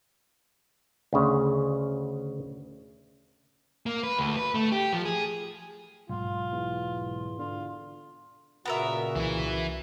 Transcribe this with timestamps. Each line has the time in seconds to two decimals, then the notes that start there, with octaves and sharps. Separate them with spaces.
1.13 D2 C#3
3.86 A#3
4.03 B4
4.19 D2
4.37 B4
4.55 A3
4.72 G4
4.93 F3
5.05 G#4
6.09 B1 G#2 F4
6.52 E2
7.39 D3 F4
8.66 A#2 C#3 B3 F#4 A#4 E5 F#5
9.16 C2 E3 E4